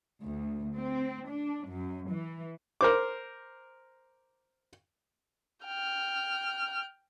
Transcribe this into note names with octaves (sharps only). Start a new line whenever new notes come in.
D2
C4
D4
F#2
E3
A#4 C5 D6
G5 F6